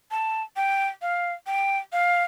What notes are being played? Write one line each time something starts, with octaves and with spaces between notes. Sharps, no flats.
A5
G5
F5
G5
F5